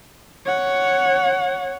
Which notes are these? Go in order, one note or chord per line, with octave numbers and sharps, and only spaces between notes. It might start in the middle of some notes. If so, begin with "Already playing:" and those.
C#5 F#5